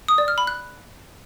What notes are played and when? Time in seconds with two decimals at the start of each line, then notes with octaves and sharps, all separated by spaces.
0.08 D#6
0.18 D5
0.28 F6
0.38 B5
0.47 F#6